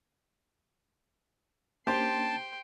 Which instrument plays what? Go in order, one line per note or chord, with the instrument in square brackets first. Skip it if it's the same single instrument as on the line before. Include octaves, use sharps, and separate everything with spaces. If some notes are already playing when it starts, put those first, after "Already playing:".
[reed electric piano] A#3 C#4 D4 [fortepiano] G4 C5 [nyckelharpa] G5 C6 [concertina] A5